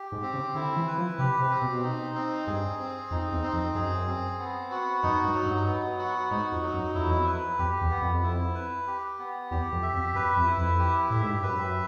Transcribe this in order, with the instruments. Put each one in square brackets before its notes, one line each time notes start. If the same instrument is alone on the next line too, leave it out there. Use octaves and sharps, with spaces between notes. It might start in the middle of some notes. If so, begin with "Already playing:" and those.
Already playing: [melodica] G4
[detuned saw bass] G#2
[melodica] C4
[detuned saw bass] C#3
[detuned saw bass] D3 [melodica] E4
[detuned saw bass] E3
[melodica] B4
[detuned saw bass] F3
[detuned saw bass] C3 [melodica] G4
[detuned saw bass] C3
[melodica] C4
[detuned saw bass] B2
[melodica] D#4
C4
[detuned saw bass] G2 [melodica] G#4
[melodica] C4
[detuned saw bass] F2 [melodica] D#4
[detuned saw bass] E2
[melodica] C4
[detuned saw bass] F2
[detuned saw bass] F#2 [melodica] G#4
[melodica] C4
B3
F#4
[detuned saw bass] F#2 [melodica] D#4
[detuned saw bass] G2
[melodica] F#3
[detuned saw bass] G2
[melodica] B3
F#4
[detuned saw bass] G#2 [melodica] D#4
[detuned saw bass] F2
[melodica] F#3
[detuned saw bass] F#2
[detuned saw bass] F2 [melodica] E4
[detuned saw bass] E2
F2
[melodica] B4
[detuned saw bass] F2 [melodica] G4
[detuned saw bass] E2
[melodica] B3
[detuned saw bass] F2
[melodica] E4
B4
G4
B3
[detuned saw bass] E2 [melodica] G4
[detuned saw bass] F2
[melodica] E5
[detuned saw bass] F2
[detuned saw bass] F#2 [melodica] B4
[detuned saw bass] F2
[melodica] E4
[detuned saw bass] F2
[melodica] G4
[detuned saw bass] A2 [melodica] E5
[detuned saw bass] G#2
G2
[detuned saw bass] F#2 [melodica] B4